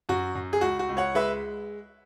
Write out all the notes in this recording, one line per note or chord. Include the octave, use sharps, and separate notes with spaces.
F#2 F#4
F#2
G#4
C#2 F#4
F#4
C#2
C#5 F#5
G#3 B4 E5